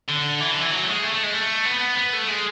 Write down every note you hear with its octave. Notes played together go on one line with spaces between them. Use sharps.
D3
E3
D3
E3
F#3
A3
G#3
A3
A3
G#3
A3
B3
B3
A3
G#3